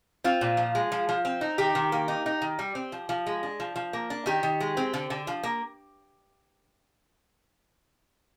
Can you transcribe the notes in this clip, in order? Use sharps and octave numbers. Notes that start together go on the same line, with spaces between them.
C4 F4
A#2
F3
G#3
F3
F3
C4
D#4
D#3 G4
D#3
A#3
D#4
D#4
D#3
G3
C4
F3
F3
G#3
D4
F3
F3
A#3
D4
D#3 G4
D#3
G#3
C4
D3
D3
F3
A#3